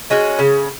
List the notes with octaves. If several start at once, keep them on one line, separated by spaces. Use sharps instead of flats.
G#3 C#4 F#4
C#3